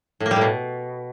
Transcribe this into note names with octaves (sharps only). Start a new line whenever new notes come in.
A2
A#3
G3
A2
B2